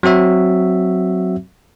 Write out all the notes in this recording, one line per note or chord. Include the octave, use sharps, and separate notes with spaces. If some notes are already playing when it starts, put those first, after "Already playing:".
F#3 C4 F#4 E5